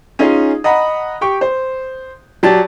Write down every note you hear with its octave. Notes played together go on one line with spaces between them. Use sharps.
C#4 D#4 F4 G#4
D#5 F#5 A#5 B5
G4 G5 C#6
C5
F#3 G4 D5 A5 A6